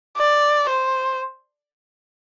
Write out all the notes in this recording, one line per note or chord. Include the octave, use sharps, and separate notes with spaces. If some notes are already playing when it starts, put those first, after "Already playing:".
D5
C5